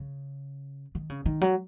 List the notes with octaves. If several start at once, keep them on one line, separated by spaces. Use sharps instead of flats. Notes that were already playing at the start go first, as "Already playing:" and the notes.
Already playing: C#3
D#3
C#3
D#3
F#3